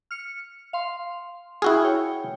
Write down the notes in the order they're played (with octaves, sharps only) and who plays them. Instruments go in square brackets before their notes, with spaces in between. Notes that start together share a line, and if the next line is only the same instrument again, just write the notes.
[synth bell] F6 C#7
F5 C6
[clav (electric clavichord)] E4 F#4 G#4 [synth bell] G5 F6
[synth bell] C#5 G5